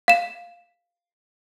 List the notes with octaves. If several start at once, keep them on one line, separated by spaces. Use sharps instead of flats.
F5 E7